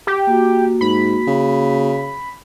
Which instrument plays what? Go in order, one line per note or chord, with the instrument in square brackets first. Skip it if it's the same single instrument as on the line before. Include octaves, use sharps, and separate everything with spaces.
[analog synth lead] G4
[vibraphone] A#3 F#4
[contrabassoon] G#2 [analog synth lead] B5
[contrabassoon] C#3